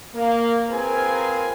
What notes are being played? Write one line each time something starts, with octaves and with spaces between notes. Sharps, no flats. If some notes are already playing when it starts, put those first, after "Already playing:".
A#3
C4 F4 G#4 A#4 B4 G#5